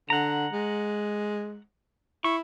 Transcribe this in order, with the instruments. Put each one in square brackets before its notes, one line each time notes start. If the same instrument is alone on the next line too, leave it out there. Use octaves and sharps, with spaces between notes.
[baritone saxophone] D3 [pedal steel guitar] F#5 A#5
[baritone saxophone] G#3
[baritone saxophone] E4 [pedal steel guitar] C#6